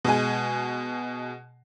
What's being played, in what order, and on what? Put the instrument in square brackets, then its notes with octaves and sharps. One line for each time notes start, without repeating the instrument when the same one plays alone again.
[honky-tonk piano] B2 G#3 G#5